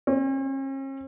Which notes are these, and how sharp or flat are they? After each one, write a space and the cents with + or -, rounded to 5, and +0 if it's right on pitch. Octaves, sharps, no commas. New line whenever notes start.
C#4 -45